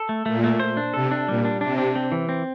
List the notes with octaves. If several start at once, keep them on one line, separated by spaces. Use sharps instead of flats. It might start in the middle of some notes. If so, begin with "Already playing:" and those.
Already playing: A4
A3
A#2 A3
A3
C5
D4
C3 A4
D4
A#2 G3
D4
C3 D4
D4
C4
E3
C4